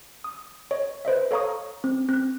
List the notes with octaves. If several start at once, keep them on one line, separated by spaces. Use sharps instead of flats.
D#6
C#5 D#5
B4 C5 D#5 E5
A4 C#5 F5 A#5 C#6 D#6
C4
C4 F#6